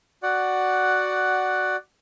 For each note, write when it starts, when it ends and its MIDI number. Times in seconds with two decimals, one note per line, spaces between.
0.23 1.76 66
0.23 1.76 74
0.23 1.76 78